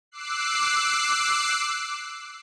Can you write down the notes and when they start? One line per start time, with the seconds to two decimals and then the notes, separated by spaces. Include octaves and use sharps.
0.11 D6 E6 F#6 C7